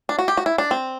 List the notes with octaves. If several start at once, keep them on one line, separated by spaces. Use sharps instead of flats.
D4
F#4
G4
F#4
E4
D4
C4